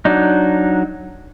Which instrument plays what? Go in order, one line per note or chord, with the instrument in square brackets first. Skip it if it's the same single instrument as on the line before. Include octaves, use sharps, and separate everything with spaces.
[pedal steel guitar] F#3 D4 D#4